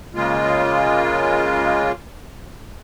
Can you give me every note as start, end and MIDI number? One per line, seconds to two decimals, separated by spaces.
0.15 1.92 49
0.15 1.92 56
0.15 1.92 58
0.15 1.92 65